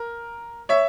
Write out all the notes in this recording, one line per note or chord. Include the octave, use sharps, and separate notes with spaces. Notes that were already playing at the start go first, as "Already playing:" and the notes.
Already playing: A#4
C#5 E5